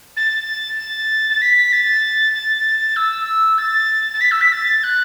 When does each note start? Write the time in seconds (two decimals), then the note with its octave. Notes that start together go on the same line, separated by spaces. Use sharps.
0.17 A6
1.30 A6
1.42 B6
1.73 A6
2.34 A6
2.96 E6
3.58 A6
4.14 A6
4.21 B6
4.31 E6
4.41 B6
4.52 A6
4.84 F#6